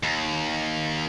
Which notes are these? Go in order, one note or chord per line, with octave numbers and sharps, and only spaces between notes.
D#2